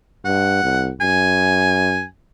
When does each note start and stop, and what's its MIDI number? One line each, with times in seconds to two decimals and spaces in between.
0.25 0.63 43
0.25 0.88 78
0.63 0.92 36
1.01 2.06 42
1.01 2.04 80